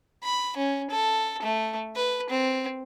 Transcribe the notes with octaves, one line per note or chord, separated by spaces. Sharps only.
B5
C#4
A4
A3
B4
C4